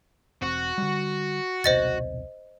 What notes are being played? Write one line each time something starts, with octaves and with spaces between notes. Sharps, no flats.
E1 C4 F#4
D3 G3
D#1 B1 C3 C5 D#5 A6